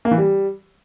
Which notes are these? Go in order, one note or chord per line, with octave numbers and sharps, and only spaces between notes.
A#3
E3
G3